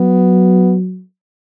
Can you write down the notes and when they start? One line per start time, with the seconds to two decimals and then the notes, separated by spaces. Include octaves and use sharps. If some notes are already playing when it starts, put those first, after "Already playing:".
Already playing: F#3 B3